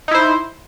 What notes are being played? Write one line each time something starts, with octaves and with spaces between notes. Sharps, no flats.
D#4 E4 C5